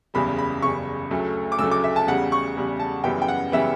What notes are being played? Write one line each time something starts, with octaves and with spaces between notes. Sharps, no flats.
F#1 E2 C#3 G3 B5
B5
F#1 E2 C#3 G3 C#6
D2 C#3 F#3 A3
D6
D2 C#3 F#3 A3 E6
D6
E5
A5
E2 C#3 G3 F#5
C#6
E2 C#3 G3
A5
F#2 C#3 E3 G3 B3 G5
G5
F#5
C#3 E3 G3 B3 E5